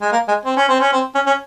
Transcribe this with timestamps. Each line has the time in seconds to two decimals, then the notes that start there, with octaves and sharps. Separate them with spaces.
0.02 G#3
0.12 A#3
0.28 G#3
0.46 C4
0.57 C#4
0.69 C4
0.80 C#4
0.93 C4
1.15 C#4
1.27 C#4